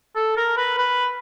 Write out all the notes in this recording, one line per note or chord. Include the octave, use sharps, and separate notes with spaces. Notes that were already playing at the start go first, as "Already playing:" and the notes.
A4
A#4
B4
B4